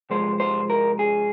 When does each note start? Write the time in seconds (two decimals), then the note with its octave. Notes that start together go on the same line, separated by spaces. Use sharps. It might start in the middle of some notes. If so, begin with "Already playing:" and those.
0.10 C3 F3 G#3 C5
0.40 C5
0.70 A#4
0.99 G#4